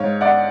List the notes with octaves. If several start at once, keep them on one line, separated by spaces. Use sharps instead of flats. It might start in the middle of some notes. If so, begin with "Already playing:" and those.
Already playing: G#2 C#5 F5
D5 F#5